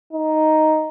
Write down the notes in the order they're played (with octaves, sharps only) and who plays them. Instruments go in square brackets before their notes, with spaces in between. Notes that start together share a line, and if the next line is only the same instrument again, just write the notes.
[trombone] D#4